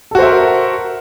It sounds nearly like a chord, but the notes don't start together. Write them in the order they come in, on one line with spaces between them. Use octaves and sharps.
A4 F#4 C5 E5 A#4